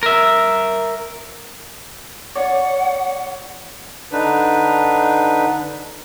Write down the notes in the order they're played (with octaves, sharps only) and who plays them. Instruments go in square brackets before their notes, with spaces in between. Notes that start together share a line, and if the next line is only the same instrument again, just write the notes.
[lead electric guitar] A#4 E5
[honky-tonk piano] C#5 D5 [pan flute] F#5
[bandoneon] D3 D4 D#4 B4